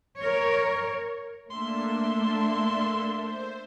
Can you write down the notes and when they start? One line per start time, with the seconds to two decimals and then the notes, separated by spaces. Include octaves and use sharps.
0.20 A#4 C#5
1.50 A3 A#3 D4 A4 E5 C6
3.18 C5